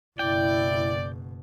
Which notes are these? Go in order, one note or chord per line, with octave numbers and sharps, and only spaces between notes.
F#1 B2 E4 D5 G5